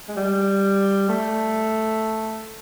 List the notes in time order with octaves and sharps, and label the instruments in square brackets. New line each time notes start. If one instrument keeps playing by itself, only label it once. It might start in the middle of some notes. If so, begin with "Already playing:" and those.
[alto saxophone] G#3
G3
A3